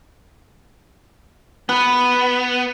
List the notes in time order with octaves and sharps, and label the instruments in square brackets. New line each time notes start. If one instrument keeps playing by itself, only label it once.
[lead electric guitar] B3 [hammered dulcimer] B4